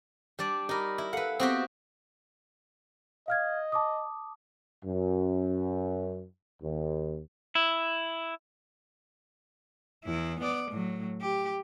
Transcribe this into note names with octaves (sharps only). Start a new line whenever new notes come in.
G3 D4 D5
D#4 G4 A#4 D5 B5
E4
A4 B4 F5 F#5
B3 C4 F#4 G4 F5 D#6
D#5 F5 F6 G#6
A5 D6 D#6
F#2
D#2
E4
E2 E4
B3 D5
A2 F#3
G4